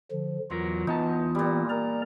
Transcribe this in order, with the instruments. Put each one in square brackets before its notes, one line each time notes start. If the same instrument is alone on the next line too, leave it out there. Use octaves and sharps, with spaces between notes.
[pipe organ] D3 F3
[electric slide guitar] E2 F#3 A#4 [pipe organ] F4
[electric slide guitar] E3 B3 A5 [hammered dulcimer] D#4
[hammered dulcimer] A#2 G3
[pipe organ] A#4 D5 A#5